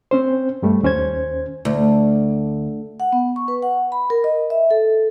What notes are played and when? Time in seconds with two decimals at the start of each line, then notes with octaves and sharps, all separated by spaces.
0.11 C4 C#4 C5
0.62 G2 G3 A3
0.83 D#2 C#4 C5 G#6
1.65 D2
3.00 F#5
3.13 B3
3.36 C#6
3.48 B4
3.62 F#5
3.92 B5
4.10 A#4
4.24 D#5
4.50 E5
4.71 A4